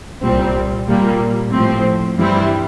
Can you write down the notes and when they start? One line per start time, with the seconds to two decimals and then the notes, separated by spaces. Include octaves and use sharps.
0.22 C2 A#2 G3 C4
0.88 A#2 G3 A#3
1.52 A2 F3 C4
2.16 G2 E3 G3 C4 E4